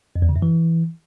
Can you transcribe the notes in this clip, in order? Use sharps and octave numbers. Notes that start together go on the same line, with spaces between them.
F2
E2
C#3
F#2
E3